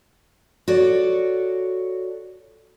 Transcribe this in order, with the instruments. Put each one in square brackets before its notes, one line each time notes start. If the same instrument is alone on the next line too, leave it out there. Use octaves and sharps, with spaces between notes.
[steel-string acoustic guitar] F#4 A4 C#5 D5